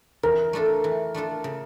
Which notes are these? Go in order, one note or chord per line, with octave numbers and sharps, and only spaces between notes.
E3 A#4
A3 D4 F4 A4
E3
A3 D4 F4 A4
C#3